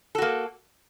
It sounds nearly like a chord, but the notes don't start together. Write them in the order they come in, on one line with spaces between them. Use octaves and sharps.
A4 F#4 A#3